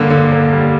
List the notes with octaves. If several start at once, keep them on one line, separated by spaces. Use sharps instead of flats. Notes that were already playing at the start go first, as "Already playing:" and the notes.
Already playing: G2 D3 A#3
D3
A#3
G3